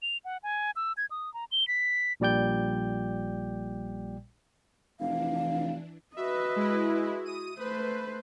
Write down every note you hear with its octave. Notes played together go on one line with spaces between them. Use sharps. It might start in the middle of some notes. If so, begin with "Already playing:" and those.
F7
F#5
G#5
E6
G#6
D#6
A#5
G7
B6
A#1 A#2 G3 D5 G5 G6
F1 E3 D4 F5
F#4 B4 D#5 E5
G#3 E4
D#6 D#7
A3 B4 C5